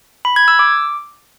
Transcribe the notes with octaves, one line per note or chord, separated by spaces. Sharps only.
B5
G#6
E6
D6